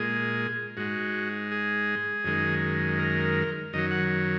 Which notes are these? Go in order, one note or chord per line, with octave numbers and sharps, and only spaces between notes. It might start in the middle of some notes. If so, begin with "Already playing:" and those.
Already playing: A#2 G#3 G#4
G#2 G#3 F#4
G#4
F#2 D#3 G#3
A#4
F#2 D#3 F#3 D#5
F#5